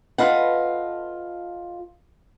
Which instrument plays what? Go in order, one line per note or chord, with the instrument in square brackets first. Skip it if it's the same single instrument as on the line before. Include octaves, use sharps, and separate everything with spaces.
[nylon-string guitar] F4 A4 B4 D#5 F#5